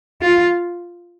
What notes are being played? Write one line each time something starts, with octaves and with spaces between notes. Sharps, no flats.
F4